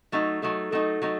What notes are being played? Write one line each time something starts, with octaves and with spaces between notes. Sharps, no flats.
F#3 A3 D#4
F#3 A3 D#4 A4
F#3 A3 D#4 A4
F#3 A3 D#4